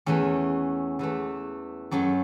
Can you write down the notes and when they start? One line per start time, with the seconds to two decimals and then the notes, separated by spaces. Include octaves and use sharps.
0.06 E2 E3 A3 C#4
0.99 E2 E3 A3
1.91 F#2 F#3 A3 C#4